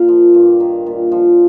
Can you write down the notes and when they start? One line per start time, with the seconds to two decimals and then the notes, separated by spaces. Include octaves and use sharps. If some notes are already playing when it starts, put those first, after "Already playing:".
Already playing: A#2 F5
0.08 F3
0.34 G2 F5
0.60 D#3
0.86 A#2
1.12 F3